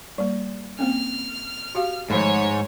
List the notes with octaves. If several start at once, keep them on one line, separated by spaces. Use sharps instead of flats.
G3 A#3
A#3 C4 C#4 F6
F#4 G4 F5
G#2 D#3 F3 A3 C#5